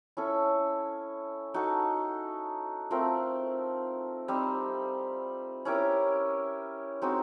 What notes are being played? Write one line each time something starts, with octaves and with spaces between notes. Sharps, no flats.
C#4 E4 A4
D#4 F#4 A4
A3 C4 F4 A#4
G3 C4 D#4
C#4 E4 G4 A#4
G#3 C4 D#4 F#4